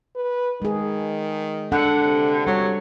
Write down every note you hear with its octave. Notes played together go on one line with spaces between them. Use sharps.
B4
D#3 G#3 G#4
D3 D4 A4 F#5
C3
F#3 G3 C#5